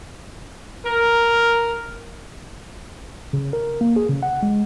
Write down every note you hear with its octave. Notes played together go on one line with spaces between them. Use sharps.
A#4
C#3
A#4
A#3
G#4
C#3
F#5
G#3